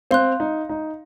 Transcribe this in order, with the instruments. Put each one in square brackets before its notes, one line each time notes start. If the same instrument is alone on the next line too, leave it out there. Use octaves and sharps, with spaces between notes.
[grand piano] C4 [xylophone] F5 C6 F#6
[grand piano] D#4
D#4